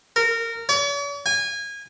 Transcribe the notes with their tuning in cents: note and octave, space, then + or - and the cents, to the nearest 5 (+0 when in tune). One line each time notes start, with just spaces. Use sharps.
A#4 -20
C#5 +45
G#5 -25